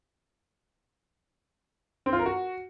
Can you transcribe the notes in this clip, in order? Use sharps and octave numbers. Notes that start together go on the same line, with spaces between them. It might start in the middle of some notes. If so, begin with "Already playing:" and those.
C4
F4
A#4
F#4